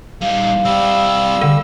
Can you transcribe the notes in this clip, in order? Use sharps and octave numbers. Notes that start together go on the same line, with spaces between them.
G3 D#4 F5
G3 C4 E4 E6
D3